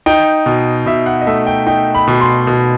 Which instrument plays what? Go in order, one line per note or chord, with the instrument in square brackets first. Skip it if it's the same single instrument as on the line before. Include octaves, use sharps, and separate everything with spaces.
[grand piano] D#4 G5
B2
B2 E5
F#5
D#5
A3 E5
G5
D#4 G5
B5
B2
C6
B2